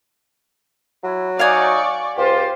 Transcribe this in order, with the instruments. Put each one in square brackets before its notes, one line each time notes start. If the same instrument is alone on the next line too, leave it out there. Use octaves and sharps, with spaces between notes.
[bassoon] F#3 [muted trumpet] E4
[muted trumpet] D#4 [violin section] D5 C#6 [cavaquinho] F5 F#5 G#5
[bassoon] C#2 [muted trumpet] F4 [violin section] G4 C5